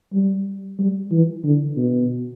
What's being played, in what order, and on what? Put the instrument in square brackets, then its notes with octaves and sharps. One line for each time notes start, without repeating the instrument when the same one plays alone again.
[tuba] G3
G3
E3
D3
B2